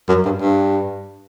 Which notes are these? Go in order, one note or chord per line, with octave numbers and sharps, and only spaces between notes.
F#2
G2
G2